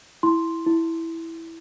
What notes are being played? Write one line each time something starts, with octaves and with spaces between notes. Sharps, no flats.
E4 C6
E4